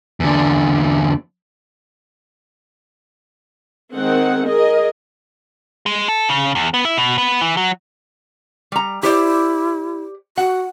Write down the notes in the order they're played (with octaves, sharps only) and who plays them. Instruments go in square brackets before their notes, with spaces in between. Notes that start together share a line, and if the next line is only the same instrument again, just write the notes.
[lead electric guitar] E2 D3
[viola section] D#3 G#3 C4 G#4 F#5
G#4 A#4 D#5
[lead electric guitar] G#3
A4
C#3
E2
B3
E4
B2
B3
E3
F#3
[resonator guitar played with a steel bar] G3 A#5
[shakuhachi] E4 [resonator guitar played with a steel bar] G4 C5 D5
[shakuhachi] F#4 [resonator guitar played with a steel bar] F#5